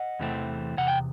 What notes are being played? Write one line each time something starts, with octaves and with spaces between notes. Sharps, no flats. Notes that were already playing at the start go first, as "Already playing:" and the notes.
Already playing: D#5 F#5
E2 C3 E3 A3 C4
E2 C3 F#5
G5